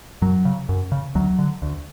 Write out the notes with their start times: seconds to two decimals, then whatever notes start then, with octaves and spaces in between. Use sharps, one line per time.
0.22 F#2 F#3
0.45 C#3
0.69 F#2
0.92 C#3
1.15 D2 F#3
1.39 D3
1.62 D2